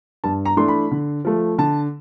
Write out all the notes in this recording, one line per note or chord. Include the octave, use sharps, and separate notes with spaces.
G2 A5
A#5
E3 A3 D4 C6
B5
D3
F3 A3
D3 A5